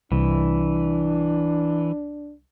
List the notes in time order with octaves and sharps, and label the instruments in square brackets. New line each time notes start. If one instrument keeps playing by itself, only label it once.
[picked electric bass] C2 [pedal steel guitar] E3 [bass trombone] D4